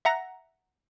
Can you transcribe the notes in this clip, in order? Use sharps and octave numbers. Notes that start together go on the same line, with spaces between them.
E5 F#5 A#5 A#6